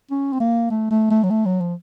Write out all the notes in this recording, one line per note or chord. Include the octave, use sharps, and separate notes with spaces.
C#4
C4
A#3
A3
A3
A3
F#3
A3
F#3
F3